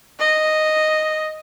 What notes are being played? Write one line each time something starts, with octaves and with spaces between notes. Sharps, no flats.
D#5